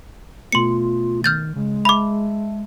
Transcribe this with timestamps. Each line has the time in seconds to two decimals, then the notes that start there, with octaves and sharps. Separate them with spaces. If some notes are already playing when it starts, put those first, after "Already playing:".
0.52 B2 A3 B3 F4 C6 C#7
1.24 D#3 F6 G6 A6
1.56 C#3 G#3
1.85 E5 A5 B5 D6